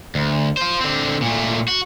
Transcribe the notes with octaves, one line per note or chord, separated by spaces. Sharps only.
D2
F4 C5
D3 C4
A#2 A3
F#4